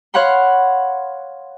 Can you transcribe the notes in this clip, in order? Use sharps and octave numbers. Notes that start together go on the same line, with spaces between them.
C#5 F5 F#5 B5 C6